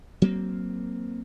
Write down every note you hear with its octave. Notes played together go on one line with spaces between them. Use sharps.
F#3 A#3 C4